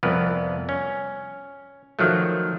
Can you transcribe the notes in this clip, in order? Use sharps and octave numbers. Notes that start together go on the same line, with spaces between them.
C2 F2 B3 A#4 B4
C#4
D#3 F3 F#3 A3